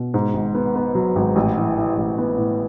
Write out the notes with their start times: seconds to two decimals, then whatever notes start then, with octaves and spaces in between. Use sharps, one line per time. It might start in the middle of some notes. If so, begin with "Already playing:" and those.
Already playing: B2
0.14 G#2
0.34 G#1
0.55 B3
0.76 B3
0.95 F#3
1.16 G#1
1.36 A1
1.57 E3
1.78 E3
1.97 A1
2.18 B3
2.38 A2